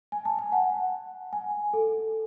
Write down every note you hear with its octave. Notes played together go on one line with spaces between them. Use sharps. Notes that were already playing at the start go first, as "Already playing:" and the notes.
G#5
A5
G#5
F#5
G#5
A4